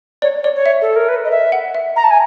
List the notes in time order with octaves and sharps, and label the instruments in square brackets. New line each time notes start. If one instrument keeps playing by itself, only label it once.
[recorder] C#5 [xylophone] D5
[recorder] C#5 [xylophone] D5
[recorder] C#5
[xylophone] E5
[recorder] A4
A#4
B4
D#5
E5
[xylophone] F#5
E5
[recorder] A#5
A5
G#5